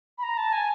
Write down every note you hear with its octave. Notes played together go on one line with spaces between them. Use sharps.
B5
A#5
A5
G#5